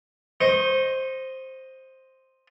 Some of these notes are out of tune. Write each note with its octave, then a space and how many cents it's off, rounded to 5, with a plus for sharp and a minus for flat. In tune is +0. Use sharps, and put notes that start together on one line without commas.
C5 +5 D#5 +0 C#6 -30